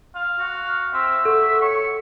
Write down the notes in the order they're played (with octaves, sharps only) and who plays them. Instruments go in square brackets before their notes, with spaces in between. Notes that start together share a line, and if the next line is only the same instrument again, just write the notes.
[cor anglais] F5
[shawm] F#4
[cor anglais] C4 [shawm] E5
[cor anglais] F#4 [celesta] A4
[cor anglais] C#5 [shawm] C#6